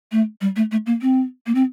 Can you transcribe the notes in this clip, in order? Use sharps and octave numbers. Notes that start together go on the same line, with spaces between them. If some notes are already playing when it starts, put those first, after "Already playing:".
A3
G3
A3
A3
A#3
C4
A#3
C4